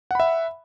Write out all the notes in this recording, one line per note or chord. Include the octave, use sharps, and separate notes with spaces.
E5 F#5 B5